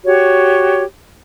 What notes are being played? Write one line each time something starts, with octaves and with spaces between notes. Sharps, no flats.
F#4 G4 C#5